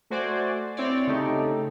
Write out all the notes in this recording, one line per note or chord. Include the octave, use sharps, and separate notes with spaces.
A3 F#4 C5 D5 G#5
C4 E4 C#5 D5
C#3 A3 D#4 G4 A4